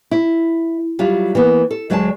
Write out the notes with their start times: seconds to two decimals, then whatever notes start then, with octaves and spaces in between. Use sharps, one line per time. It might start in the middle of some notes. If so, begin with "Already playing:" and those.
0.11 E4
0.99 F#3 G3 E4 F4
1.35 E3 A#3 B3
1.71 A4
1.90 D2 F#3 G#3 D5 D#5 A5